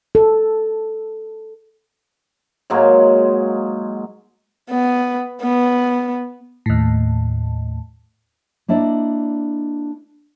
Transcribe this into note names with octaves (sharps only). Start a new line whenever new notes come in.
A4
G#2 F#3 G#3 A#3
B3
B3
D#2 A2
A#3 D4 E4 D5 D#5